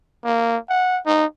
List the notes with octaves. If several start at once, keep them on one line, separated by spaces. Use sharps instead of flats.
A#3
F#5
D#4